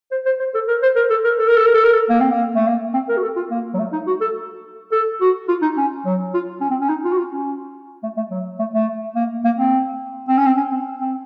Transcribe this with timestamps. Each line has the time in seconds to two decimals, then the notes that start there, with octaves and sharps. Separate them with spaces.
0.12 C5
0.26 C5
0.40 C5
0.55 A4
0.68 A#4
0.83 C5
0.96 A#4
1.10 A4
1.24 A#4
1.39 A4
1.48 A#4
1.56 A4
1.66 A#4
1.74 A4
1.84 A#4
1.93 A4
2.09 A#3
2.20 C4
2.31 A#3
2.56 A3
2.67 A#3
2.94 C4
3.09 A#4
3.17 F#4
3.23 A4
3.36 F4
3.51 A#3
3.74 F#3
3.79 A3
3.93 D#4
4.07 F#4
4.21 A4
4.92 A4
5.21 F#4
5.48 F4
5.62 D#4
5.77 C#4
6.05 F#3
6.34 F4
6.61 C#4
6.70 C4
6.81 C#4
6.89 D#4
7.04 F4
7.12 F#4
7.18 F4
7.33 C#4
8.03 A3
8.17 A3
8.31 F#3
8.59 A3
8.74 A3
9.16 A#3
9.45 A#3
9.59 C4
10.28 C4
10.38 C#4
10.46 C4
10.57 C#4
10.72 C4
11.00 C4